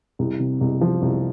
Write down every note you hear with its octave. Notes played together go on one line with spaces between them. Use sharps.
C2
C3
C2
F3
C2